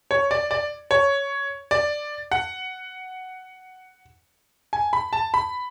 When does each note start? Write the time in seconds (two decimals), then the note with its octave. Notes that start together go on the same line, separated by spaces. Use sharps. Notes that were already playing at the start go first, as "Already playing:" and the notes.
0.11 C#5
0.31 D5
0.51 D5
0.91 C#5
1.71 D5
2.32 F#5
4.73 G#5
4.93 B5
5.13 A5
5.34 B5